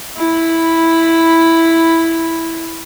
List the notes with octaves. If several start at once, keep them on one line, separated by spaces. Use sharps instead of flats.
E4 B5